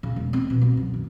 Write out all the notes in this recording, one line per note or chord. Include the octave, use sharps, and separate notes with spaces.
C#3
E1
C4
B2
C2
F#2
D#3